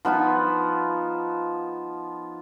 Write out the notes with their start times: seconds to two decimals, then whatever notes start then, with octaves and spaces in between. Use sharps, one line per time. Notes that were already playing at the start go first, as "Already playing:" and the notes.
0.05 F3 B3 D#4 F4